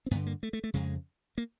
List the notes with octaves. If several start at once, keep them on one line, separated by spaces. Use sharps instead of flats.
C4
G2 D3 B3
A#3
A3
A3
A3
F2 C#3 G#3
A#3